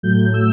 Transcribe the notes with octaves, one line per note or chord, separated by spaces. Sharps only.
A2 F#3 A3 G6
E6